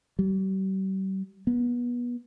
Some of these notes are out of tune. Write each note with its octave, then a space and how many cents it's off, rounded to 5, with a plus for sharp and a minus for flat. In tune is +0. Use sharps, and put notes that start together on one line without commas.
G3 -40
B3 -30